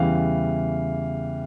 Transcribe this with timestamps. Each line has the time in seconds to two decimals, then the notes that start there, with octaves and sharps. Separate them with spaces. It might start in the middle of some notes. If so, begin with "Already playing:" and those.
Already playing: E2 C#3 E3 G3 F5